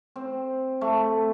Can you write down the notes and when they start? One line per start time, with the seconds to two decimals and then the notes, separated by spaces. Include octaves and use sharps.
0.16 C4
0.81 A3